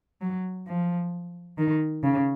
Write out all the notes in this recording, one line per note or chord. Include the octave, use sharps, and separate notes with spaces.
F#3
F3
D#3
C#3